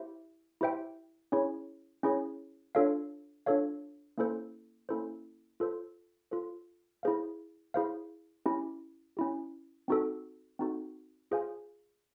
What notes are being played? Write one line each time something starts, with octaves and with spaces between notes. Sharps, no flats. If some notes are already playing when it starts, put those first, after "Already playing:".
Already playing: E4 G4 C5 E5
E4 G4 C5 E5 G5
C#4 E4 G#4 C#5
C#4 E4 G#4 C#5
D4 F4 A4 C#5 F5
D4 F4 A4 C#5 F5
A#3 C#4 E4 A4 C5
A#3 C#4 E4 A4 C5
F4 A4 C5
F4 A4 C5
E4 G#4 C5 F5
E4 G#4 C5 F5
C#4 E4 G4
C#4 E4 G4
C4 D#4 F#4 A4
C4 D#4 F#4 A4
F4 G#4 C5 F5 G#5